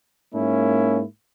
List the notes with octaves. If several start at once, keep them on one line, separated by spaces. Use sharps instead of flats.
G#2 A#3 C#4 E4